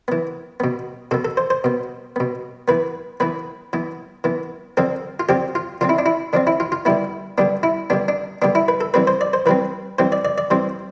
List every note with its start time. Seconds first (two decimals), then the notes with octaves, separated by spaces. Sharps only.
0.08 E3 B3
0.60 B2 B3
1.11 B2 B3 A4
1.25 A4
1.37 C5
1.50 C5
1.64 B2 B3
2.16 B2 B3
2.68 E3 B3 B4
3.20 E3 B3 B4
3.73 E3 B3
4.24 E3 B3
4.77 D3 F3 C4 A4
5.20 F4
5.29 D3 F3 C4 G4
5.55 F4
5.81 D3 F3 C4 F4
5.89 E4
5.99 D4
6.06 E4
6.33 D3 F3 C4 D4
6.47 E4
6.60 F4
6.72 F4
6.85 D3 G3 B3 E4
7.38 D3 G3 B3 D4
7.63 E4
7.90 D3 G3 B3 D4
8.08 D4
8.42 D3 G3 B3 D4
8.55 E4
8.68 B4
8.81 A4
8.94 E3 G3 C4 B4
9.07 C5
9.21 D5
9.33 C5
9.46 E3 G3 C4 B4
9.99 E3 G3 C4 C5
10.12 D5
10.25 D5
10.38 D5
10.50 E3 G3 C4 C5